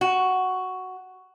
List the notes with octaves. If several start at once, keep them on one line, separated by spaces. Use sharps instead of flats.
F#4